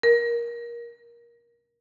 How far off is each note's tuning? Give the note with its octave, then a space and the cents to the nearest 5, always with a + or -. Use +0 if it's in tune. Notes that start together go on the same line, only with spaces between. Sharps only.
A#4 +20